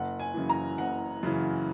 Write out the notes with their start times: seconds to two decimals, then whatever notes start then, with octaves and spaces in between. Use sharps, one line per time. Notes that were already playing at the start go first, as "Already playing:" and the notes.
Already playing: F#1 F#5
0.19 G#5
0.34 F#2 C#3 E3
0.49 A#5
0.78 F#1 F#5
1.23 F#2 C#3 E3